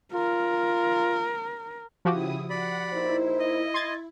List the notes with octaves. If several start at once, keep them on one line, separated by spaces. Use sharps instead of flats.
F4 A#4
C#3 F3 E4 F#4 G4 D#6
D5 F#5 B5
A#2 D#4 E4 C5
D#5
C6 G#6 A6